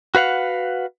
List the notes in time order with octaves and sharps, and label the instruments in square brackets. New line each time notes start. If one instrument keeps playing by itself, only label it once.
[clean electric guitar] F#4 B4 F5 F#5